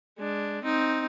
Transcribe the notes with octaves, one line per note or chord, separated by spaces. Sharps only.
G#3 D4
C4 D#4